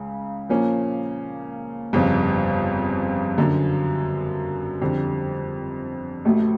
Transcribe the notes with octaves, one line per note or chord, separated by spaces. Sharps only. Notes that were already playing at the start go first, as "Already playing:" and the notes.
Already playing: C#2 C#3
A#2 F3 A#3 C#4
G1 F2 C#3
F#2 D3 F#3
F2 D3 G3
A1 A2 F#3 A3